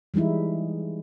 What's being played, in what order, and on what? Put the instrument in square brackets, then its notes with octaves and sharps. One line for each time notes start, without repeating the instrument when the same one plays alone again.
[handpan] E3 G3 G#3 D#4 E4